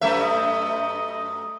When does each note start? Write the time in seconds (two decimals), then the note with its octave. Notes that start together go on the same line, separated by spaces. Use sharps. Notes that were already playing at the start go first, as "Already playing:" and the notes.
0.01 F#2 A3 E5
0.21 D#5